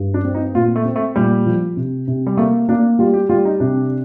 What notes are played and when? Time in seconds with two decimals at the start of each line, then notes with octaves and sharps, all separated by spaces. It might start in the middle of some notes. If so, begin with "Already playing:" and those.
Already playing: G2
0.14 D4
0.24 C4
0.34 D#4
0.55 A#2 F4
0.76 A3
0.85 C4
0.96 A3
1.16 A#2 G3
1.46 F3
1.77 C3
2.08 C3
2.27 G3
2.37 A3 A#3
2.69 A#3 D4
2.99 G3 F4
3.14 G4
3.29 G3 F4
3.45 D#4
3.60 C3 D4